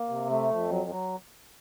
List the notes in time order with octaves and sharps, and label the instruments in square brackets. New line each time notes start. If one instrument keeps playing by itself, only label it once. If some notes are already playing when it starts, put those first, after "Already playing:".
Already playing: [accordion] A#3
C3
A3
F2
F#3
F#3